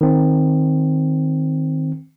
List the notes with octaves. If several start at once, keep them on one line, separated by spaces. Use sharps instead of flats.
D#3 C4